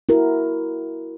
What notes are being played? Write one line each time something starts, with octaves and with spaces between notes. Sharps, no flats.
E4 F#4 A#4